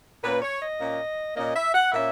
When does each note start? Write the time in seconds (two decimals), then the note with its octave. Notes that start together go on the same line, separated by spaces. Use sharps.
0.23 A#2 A#3 C#4 B4
0.42 C#5
0.60 D#5
0.79 A#2 A#3 C#4
1.36 A#2 A#3 C#4 D#5
1.55 E5
1.74 F#5
1.92 A#2 A#3 C#4 E5